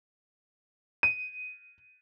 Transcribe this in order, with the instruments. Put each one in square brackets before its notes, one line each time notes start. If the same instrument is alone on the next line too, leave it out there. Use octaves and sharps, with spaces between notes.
[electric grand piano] D#7